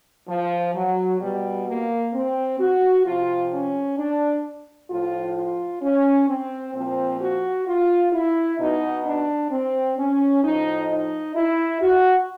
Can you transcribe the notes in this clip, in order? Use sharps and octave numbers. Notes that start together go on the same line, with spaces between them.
F3
F#3
B2 G3
A#3
C4
F#4
C3 F3 F4
C#4
D4
A2 F3 F4
F4
C#4
C4
A#2 F3 C4
F#4
F4
E4
B2 D#4
D4
C4
C#4
A2 F3 D#4
D#4
E4
F#4